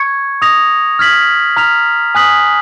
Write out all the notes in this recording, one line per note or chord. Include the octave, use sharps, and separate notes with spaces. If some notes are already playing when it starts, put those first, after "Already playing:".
Already playing: C#6 G#6 C#7
D#6 A#6 F7
F6 G#6 B6 F#7
A#5 F6 B6 F7
G#5 D#6 F#6 B6 F#7